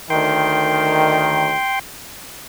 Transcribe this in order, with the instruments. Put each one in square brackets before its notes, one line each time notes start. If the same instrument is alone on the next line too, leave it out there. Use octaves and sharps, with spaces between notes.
[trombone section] D2 D#3 [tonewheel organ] G5 C6